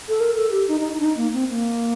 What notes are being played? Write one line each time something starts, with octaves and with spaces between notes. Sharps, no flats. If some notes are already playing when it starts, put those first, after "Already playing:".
A4
A#4
A4
G4
D#4
D#4
D#4
D4
D#4
A#3
C4
A#3